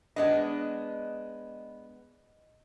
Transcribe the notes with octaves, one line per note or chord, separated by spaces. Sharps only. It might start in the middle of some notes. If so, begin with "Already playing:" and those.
G#3 B3 D4 D#5